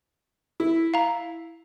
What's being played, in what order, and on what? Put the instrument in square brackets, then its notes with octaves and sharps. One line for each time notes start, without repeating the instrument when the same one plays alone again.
[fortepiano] E4
[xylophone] F5 A#5